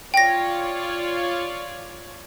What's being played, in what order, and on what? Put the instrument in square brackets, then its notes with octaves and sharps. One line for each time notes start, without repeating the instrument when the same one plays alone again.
[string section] F4 C#5 D5 [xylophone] G5 A#6